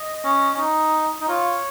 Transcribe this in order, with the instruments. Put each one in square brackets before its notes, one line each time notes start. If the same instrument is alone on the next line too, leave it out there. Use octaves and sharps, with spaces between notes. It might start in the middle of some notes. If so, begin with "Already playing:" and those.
Already playing: [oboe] D#5
[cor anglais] C#4
C#4
D#4
D#4
[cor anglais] F4 [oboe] C#5